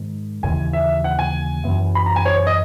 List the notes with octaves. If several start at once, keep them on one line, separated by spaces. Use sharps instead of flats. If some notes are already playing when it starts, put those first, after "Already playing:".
Already playing: G#2 D#3 G#3
D#2 C#3 E3 G#5
E5
F#5
G#5
F#2 E3 B3
B5
A#5
G#5
C#5
C#5
D#5